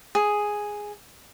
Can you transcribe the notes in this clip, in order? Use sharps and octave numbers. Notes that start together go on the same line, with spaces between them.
G#4